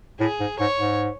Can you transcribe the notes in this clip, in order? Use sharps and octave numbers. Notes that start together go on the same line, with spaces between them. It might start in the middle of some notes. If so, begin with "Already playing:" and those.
A2 G#4
G#2
G#2 C#5
G#2